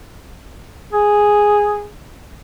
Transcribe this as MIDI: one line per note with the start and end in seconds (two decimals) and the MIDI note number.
0.92 1.87 68